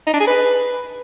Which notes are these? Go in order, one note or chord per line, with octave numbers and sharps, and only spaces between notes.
D#4
D4
G#4
B4